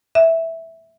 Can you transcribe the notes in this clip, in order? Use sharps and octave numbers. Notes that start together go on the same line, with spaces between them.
E5